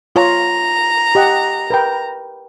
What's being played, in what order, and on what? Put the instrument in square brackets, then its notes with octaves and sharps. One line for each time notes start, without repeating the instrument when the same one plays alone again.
[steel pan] F4 C#5 [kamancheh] A#5
[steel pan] G4 D#5 F#5
A#4 B4 G5